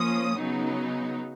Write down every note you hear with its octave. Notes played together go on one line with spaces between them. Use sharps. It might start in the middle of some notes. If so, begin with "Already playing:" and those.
Already playing: F3 A#3 C#4 D#6
C#3 F#3 B3 D#4